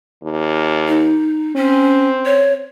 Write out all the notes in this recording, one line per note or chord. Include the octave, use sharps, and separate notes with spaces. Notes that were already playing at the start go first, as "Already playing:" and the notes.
D#2
D#4
C4 C#4
C#5